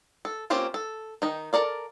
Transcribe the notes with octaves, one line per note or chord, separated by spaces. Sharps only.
A4
A#3 C4 C#4 F4 G4
A4
D#3 D#4
A4 A#4 D5 F5